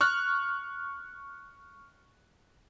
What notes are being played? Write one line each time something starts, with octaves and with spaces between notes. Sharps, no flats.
C#6 F6 F#6